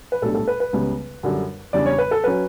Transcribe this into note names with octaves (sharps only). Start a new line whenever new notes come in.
B4
B1 A2 G3 D4 A4
A4
B4
B4
C#2 C#3 G3 B3
F#2 D3 G3 D4
E2 C#3 G3 D4 D5
C#5
B4
A4
F#3 C#4 B4